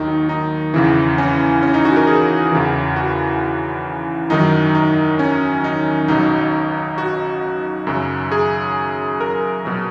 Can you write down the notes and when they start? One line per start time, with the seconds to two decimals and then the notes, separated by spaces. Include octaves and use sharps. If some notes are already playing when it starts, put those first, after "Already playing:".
Already playing: D#2 D#3 F#3 D#4
0.29 D#4
0.74 E2 C#3 E3
1.18 C#4
1.63 C#4
1.74 D#4
1.85 F#4
1.96 A#4
2.07 G#4
2.52 E2 C#3 E3
2.96 F#4
4.30 F#2 D#3 F#3 D#4
4.75 D#4
5.19 C#4
5.64 D#4
6.08 B1 B2 F#3 D#4
6.98 F#4
7.87 F#2 C#3 F#3
8.32 G#4
9.20 A#4
9.65 B2 F#3